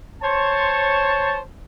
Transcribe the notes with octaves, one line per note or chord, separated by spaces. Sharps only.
C5 C#5 A5